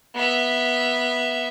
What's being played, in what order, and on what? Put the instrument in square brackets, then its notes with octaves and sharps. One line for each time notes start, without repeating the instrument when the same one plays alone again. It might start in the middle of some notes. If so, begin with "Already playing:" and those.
[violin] B3 E5